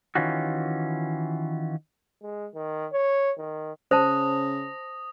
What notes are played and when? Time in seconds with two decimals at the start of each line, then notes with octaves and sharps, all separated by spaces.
0.15 D#3 E3 C#4 F4 F#4
2.22 G#3
2.55 D#3
2.92 C#5
3.37 D#3
3.91 C#3 C5 A5 D#6 A#6